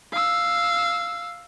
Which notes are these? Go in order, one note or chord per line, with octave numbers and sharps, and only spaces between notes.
F5 E6